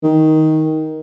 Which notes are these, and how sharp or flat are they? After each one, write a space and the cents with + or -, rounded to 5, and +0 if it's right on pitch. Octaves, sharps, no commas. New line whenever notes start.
D#3 +10